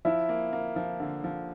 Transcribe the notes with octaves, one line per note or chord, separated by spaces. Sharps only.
F3 E4 E5
A#3
A#3
F3
D3
F3